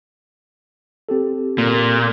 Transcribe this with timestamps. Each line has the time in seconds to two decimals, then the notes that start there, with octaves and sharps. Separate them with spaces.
1.09 C4 G4 A4
1.58 A#2